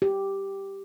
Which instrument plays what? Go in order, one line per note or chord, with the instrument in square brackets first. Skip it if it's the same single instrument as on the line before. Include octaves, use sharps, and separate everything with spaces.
[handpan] G4